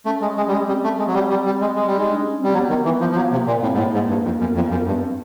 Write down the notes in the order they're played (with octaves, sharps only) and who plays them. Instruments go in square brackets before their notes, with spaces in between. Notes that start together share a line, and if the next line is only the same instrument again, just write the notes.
[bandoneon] A3 [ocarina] C#4
[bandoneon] G#3
G#3
G3
G#3
[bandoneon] G3 [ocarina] C4
[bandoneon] A3
G#3
F#3
G3
G3
G3
G#3
G#3
G3
[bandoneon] G#3 [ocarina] D#4
[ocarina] D4
C#4
[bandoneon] G3 [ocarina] C4
[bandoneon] F#3 [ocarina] B3
[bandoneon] D#3 [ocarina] B3
[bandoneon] E3 [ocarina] B3
[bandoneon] F3 [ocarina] B3
[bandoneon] F3
[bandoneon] F#3 [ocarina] B3
[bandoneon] C3 [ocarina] A#3
[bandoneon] A#2
[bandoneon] A2 [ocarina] C4
[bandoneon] G#2
[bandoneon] A2 [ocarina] A#3
[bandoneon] G#2
G2
F2
[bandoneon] F#2 [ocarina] B3
[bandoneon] F2 [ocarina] B3
[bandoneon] F#2 [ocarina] B3
[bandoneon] G2 [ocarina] B3
[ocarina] C4